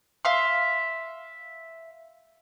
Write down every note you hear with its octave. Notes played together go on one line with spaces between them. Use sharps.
E5 F5 C6